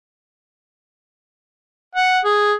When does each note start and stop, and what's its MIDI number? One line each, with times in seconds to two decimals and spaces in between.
1.95 2.19 78
2.25 2.53 68